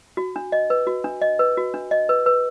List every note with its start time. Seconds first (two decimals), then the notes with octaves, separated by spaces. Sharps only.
0.17 F#4
0.36 D4
0.52 D#5
0.70 B4
0.87 F#4
1.04 D4
1.21 D#5
1.39 B4
1.57 F#4
1.74 D4
1.91 D#5
2.09 B4
2.26 B4